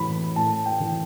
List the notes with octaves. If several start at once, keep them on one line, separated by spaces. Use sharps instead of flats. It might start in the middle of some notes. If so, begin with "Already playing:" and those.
Already playing: A2 E3 B5
A2 A5
G5
E3